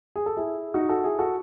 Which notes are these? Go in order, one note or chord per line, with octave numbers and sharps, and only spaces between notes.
G#4
A4
E4 G#4
D#4 F#4
F#4 A4
E4 G#4
F#4 A4